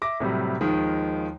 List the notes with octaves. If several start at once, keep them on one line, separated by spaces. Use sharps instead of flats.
E5 D6 A#6
A2 C3 F#3 G3
D#2 D#3 F3 G#3